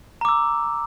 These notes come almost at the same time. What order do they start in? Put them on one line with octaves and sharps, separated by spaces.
A#5 D6 E6